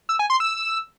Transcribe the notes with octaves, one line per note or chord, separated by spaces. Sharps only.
E6
G#5
C6
E6